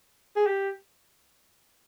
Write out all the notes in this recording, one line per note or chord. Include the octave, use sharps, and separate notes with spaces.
G#4
G4